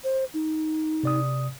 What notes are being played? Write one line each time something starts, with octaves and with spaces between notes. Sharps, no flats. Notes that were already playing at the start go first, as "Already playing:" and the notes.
C5
D#4
C3 D5 D#6